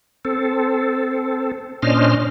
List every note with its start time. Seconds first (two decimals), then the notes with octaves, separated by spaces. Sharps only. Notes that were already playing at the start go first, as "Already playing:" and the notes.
0.25 C4 A4
1.82 A#2 C#4 D4 C5 D#5 F6